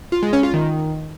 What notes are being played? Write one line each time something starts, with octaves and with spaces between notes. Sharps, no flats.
F4
G#3
C#4
F4
D#3